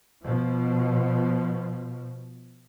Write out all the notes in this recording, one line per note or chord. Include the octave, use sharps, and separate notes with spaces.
B2 F3